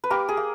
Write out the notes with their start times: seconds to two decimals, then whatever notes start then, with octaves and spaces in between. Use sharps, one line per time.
0.04 B4
0.10 A#3 G4 A#4
0.29 G#4
0.37 A#3